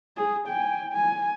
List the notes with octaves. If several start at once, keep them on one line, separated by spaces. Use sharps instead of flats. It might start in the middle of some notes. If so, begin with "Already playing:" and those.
G#4
G5 G#5
G#5